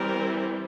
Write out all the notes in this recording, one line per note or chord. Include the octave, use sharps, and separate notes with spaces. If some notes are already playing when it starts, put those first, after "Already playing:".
Already playing: E3 G3 C4 A#4